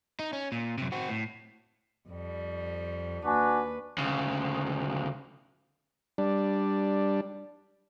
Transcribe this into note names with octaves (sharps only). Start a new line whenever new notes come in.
D#4
C#4
A#2
F#2 C3
C4 F#4
A2
F2 G3
D#2 D4 F#4 B4 G#5
D2 C#3
G3 D4